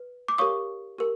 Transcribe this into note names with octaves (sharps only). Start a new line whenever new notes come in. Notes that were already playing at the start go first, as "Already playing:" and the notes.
Already playing: B4
D6
G4 A#4 C#5 F5 C#6 D#6
G4 A#4